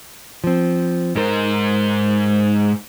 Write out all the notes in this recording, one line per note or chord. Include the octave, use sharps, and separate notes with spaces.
F3 C4
G#2 D#4 A#4 C5